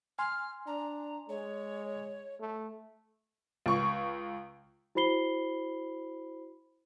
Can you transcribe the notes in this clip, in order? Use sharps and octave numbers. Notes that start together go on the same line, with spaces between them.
G#5 C6 F6
D4 A#5
G#3 C#5
A3
C#2 C#6
E4 F#4 C5 B5 C7 G7